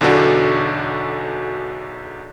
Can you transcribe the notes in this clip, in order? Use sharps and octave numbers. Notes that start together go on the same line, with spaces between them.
B1 E2 D3 F#4 A4 D5